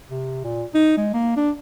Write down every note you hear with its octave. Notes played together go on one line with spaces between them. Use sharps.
C3
A#2
D#4
G#3
A#3
D4